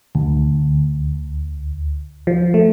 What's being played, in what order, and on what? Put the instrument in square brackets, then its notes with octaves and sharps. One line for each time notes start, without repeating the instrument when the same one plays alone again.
[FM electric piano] D2
F3
A3